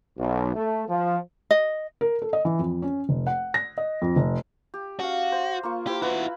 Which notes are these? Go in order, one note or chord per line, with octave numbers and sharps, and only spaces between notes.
B1
A3
F3
D#5
A#4
A4
D#5
E3
F2
C#4
F1
F#5
A#6
D#5
F2
F1
G4
C#4 F#4 F5
C5
A#3 F4 C#6
E4 F4 G4 C5
E4 F#4 B4